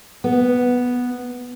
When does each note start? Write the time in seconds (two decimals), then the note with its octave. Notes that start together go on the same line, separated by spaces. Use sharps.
0.24 B3